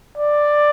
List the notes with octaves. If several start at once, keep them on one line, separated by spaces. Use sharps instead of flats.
D5